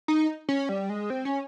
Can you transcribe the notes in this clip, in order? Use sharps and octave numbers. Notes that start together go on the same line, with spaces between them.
D#4
C#4
G3
G#3
C4
C#4